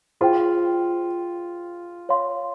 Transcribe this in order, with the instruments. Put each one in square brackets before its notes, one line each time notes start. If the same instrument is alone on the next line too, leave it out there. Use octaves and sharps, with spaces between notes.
[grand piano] F4 [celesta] G#4 C5 G5
[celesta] C#5 F5 C6